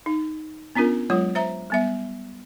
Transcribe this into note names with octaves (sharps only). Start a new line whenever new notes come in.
D#4
B3 C#4 D4 F4 A#4
F#3 G#3 F4 C#5
C5 E5 A#5
G3 B3 E5